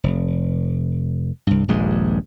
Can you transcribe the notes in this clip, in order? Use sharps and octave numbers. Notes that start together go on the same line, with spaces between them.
F1
C2 G2
D#1 A#1 G2 G#3